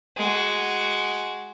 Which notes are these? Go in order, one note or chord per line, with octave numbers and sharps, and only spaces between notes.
G#3 F#4